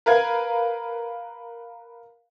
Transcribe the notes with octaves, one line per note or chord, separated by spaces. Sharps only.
A#4 B4 F5 G#6